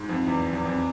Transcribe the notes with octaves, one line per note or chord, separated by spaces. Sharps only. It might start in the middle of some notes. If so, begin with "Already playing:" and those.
Already playing: G#2
F2
E2
E2
F2